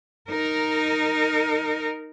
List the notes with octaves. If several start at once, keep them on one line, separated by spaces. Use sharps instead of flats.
D#4 A#4